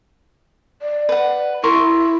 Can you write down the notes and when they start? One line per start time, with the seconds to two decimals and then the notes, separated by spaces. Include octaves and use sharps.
0.82 D5
1.09 B4 F#5
1.64 E4 A#4 C6 C#6